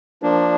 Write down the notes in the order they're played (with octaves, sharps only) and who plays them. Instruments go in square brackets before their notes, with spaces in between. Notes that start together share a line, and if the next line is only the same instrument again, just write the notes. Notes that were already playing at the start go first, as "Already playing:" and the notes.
[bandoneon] F3 A#3 D4